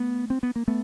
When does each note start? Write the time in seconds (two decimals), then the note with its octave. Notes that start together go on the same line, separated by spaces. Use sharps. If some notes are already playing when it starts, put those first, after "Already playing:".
Already playing: A3 B3
0.30 C4
0.43 B3
0.56 A#3
0.68 A3 B3